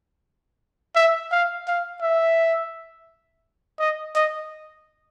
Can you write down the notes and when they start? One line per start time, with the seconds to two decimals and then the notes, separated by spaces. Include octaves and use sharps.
0.96 E5
1.32 F5
1.68 F5
2.02 E5
3.79 D#5
4.15 D#5